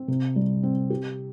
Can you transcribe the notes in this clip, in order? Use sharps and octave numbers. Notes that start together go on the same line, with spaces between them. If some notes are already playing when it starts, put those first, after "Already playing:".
Already playing: C4
C3
G3
C4
G4